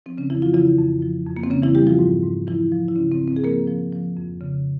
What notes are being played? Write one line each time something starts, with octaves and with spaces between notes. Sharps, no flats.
F3 C4
C#3 C#4
F2 E3 E4
F3 F4
C#3 E3 E4
F2
F3
F2
A#3
C4
C#3 C#4
E3 E4
F2 G3 G4
F3 F4
G#2
G#2
E3 F3 E4
F3
E4
G#2 C#3 C#4
C4
G#2
C4
G#4
F3 A#3 A#4
F3
F3
F2
C#3